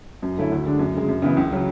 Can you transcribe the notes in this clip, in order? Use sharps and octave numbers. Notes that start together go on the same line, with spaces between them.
F#2
D3 A3 C#4 E4
D2
D3 G#3 D4
F#2
C#3 G#3
F#2
C#3 E3 B3 E4
C#2
C#3 F#3